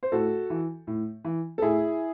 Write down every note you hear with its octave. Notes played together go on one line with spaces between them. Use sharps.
C5
A2 F#4 A4
E3
A2
E3
A4
A2 E4 G#4